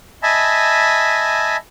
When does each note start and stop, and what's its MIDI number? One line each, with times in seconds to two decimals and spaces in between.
0.23 1.57 75
0.23 1.57 76
0.23 1.57 80
0.23 1.57 81
0.23 1.57 83